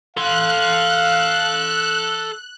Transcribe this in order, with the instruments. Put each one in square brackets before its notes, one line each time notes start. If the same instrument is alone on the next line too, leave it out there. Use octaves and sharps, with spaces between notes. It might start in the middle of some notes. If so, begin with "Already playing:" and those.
[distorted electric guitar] A4 C6 [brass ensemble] F5 [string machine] F#6